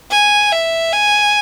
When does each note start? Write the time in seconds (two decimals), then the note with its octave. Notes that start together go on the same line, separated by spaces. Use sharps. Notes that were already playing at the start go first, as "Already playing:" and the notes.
0.12 G#5
0.52 E5
0.93 G#5